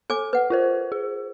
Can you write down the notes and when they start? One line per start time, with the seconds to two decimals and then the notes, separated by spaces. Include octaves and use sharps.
0.10 A4 G#5 D6
0.33 B4 F#5
0.50 F4 A#4 C5
0.92 G#4